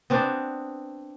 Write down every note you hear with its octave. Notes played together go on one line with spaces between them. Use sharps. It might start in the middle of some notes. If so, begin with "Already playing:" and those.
B3 C4 D4